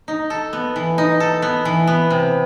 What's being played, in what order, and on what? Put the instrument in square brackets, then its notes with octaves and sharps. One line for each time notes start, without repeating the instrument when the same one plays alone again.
[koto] D#4
A4
B3
E3
D#4
A4
B3
E3
B3
C3